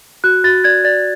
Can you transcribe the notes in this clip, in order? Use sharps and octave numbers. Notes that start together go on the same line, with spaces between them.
F#4 F#6
F#4 A6
D5 G#6
D5 A6